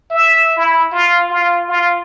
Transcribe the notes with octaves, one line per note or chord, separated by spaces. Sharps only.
E5
E4
F4
F4
F4